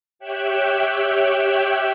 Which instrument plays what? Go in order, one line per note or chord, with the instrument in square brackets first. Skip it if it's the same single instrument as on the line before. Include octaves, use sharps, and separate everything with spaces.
[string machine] G4 C#5 E5 G5 E6 F#6